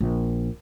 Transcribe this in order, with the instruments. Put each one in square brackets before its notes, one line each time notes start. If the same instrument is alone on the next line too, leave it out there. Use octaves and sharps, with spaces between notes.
[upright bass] A#1